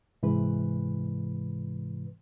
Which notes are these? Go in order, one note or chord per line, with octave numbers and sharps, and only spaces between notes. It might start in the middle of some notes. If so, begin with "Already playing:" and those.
G#2 C3 E3 G#3 B4